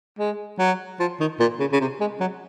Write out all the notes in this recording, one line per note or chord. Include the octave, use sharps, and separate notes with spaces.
G#3
F#3
F3
D#3
A#2
C#3
C#3
C3
G#3
F#3